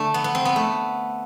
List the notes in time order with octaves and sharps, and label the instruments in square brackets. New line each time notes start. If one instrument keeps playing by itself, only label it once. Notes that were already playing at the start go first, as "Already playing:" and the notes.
Already playing: [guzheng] D3 A3
B3
B3
C4
B3
A3